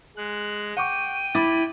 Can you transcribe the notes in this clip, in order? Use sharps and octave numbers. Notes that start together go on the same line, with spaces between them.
G#3 F#6
F#5 G5 C#6 D6 D#7
E4 B5 D6 A6